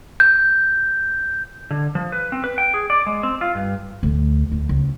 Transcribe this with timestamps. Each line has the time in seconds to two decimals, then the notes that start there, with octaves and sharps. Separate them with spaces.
0.20 G6
1.71 D3
1.95 F3
2.12 B4
2.32 C4
2.44 B4
2.58 G5
2.74 G#4
2.90 D5
3.06 G#3
3.23 C4
3.41 F4
3.55 G2
4.03 D2
4.52 D2
4.69 C#2